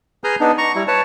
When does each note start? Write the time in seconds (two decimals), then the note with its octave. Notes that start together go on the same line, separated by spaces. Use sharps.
0.24 G#4 B4 A#5 D#6 F6 G6
0.40 B3 D4 D#4
0.58 A#5 C#6
0.75 G3 E4
0.88 B4 C#5 A5